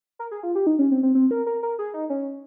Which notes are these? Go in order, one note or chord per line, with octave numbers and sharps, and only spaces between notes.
A#4
G#4
F4
G4
D#4
C#4
C4
C4
C4
A#4
A#4
A#4
G#4
D#4
C#4